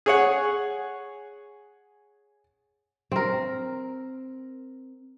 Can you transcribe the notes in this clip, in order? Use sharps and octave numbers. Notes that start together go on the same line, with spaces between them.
G#4 C#5 F#5
C4 A#4